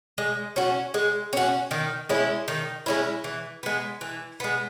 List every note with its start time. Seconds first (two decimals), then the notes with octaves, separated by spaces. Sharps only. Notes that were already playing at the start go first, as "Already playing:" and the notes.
0.18 G#3
0.56 C#4 F#4
0.94 G#3
1.33 C#4 F#4
1.71 D#3
2.09 G#3 C#4 E4
2.48 D#3
2.86 G#3 C#4 E4
3.24 E3
3.63 G#3 B3
4.01 E3
4.40 G#3 B3